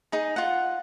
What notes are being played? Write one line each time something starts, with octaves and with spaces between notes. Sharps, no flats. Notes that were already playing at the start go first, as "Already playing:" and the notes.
D#4 G#4
F4 F#5